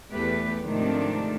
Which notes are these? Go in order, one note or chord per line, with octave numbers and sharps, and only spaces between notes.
E2 A3 G4 B4
G#2 C3 D#3 F3 A3 D4